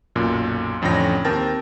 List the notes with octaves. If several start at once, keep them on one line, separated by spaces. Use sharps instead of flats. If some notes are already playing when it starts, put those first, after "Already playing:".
B1 F#2 A#2
A1 F2 D3 C#4 G5 A#6
D#2 C4 A#4 G5 A5 A6